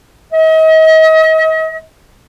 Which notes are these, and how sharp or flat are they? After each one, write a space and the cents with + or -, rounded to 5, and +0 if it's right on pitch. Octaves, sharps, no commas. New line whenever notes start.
D#5 +40